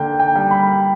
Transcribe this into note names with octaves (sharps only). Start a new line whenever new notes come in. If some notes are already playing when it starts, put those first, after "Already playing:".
Already playing: D3 A#3 G5
G5
G3
B5